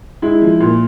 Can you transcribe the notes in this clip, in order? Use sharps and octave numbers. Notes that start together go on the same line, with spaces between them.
G#3 E4
F3
A#2